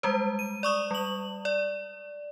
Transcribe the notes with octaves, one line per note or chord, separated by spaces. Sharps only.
G3 G#3 C5
D#7
D5 C#6 D#6
G3 F#7
D5